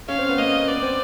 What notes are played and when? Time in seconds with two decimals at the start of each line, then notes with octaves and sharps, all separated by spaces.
0.09 C#4 F5
0.18 C4
0.29 B3
0.38 A#3 D#5
0.68 B3 D5
0.82 C4